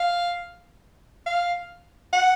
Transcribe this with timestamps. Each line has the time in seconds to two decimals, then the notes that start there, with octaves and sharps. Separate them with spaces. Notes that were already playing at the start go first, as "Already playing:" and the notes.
Already playing: F5
1.26 F5
2.13 F#5